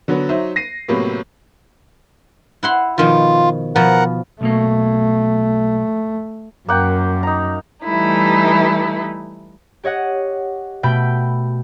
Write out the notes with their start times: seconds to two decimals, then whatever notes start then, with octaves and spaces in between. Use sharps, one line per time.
0.08 D3 F#3 B3
0.29 F#3 D#4 C5 E5
0.56 A#6 C7 D#7
0.88 A2 C3 F#3 A#3 B3
2.63 E4 F#5 C6
2.98 B2 D#3 F3 F4
3.76 B2 F3 A#4 F#5
4.41 B1 B2 A3 A#3
6.69 F#2 A#3 F#5 G5
7.23 D#4 A#5
7.85 E3 G3 A3 D#4 E4
9.84 G4 C#5 D#5 F#5
10.83 B2 A3 G5 B5 G6 D7